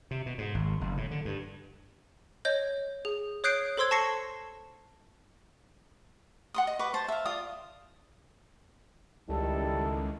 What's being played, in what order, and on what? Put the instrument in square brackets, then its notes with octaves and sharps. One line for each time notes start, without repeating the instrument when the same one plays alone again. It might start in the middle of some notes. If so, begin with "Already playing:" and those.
[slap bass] C3
B2
G#2
G#1
F#1
A2
D3
G2
[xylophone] C#5 D#5 G6
G#4
C#5 D#6 F#6 G6 C7 D7
A4 C5 C6 E6 G#6
A5 C#6 A#6 C7 C#7
[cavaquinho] F#5 C6 D#6
D#5
B4 C#6 D6
C5 A5
E5 F5
F4 D5 F5 D#6
[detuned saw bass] C#2 [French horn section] D#3 E4 [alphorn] G3 [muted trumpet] A4